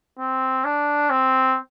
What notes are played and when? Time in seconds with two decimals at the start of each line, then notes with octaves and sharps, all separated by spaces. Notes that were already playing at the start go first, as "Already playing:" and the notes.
0.19 C4
0.65 D4
1.10 C4